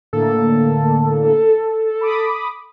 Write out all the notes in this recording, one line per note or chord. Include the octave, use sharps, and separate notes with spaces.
A2 D3 A#3 A4
B5 D6 D#6